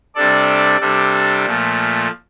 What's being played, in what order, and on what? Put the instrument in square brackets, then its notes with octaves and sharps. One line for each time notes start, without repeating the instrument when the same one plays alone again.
[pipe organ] C3 G3 D4 A4 D5
C3 G3 D4 A4
A#2 F3 A3